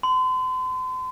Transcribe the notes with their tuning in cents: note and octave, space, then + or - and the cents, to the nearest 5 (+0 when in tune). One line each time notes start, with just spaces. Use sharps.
C6 -40